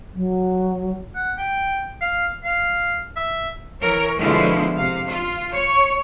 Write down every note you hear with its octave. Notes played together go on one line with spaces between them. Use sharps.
F#3
F#5
G5
F5
F5
E5
E3 A#4 C#5
B2 D3 F3 G#3 E4 F4
C3 F5
F4
C#5